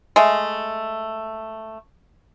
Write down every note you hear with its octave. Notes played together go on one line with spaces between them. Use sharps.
G#3 A3